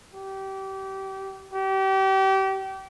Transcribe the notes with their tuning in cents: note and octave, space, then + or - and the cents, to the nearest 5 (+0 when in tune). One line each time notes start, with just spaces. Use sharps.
G4 -25
G4 -30